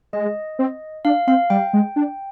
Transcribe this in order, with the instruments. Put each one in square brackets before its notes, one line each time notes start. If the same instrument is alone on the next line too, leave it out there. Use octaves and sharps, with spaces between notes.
[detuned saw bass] G#3 [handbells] D#5
[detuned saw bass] C4
[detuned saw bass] D4 [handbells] F5
[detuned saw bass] C4 [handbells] F5
[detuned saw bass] G3 [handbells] G5
[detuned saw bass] G#3
D4